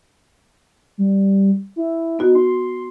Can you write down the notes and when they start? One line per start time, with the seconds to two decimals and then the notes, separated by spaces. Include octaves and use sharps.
0.98 G3
1.76 E4
2.19 B3 D#4 F#4
2.35 C6